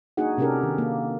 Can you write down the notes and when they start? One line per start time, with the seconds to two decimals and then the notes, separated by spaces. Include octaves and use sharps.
0.17 A#3 D4 D#4 F#4 G#4 F#5
0.38 C3 C#4 D4 G4 A4 A#4
0.63 D#3
0.78 A#3